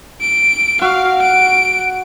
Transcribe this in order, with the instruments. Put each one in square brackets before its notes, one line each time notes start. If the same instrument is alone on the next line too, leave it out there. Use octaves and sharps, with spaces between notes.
[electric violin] D7
[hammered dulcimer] F#4 [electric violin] F5
[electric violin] D7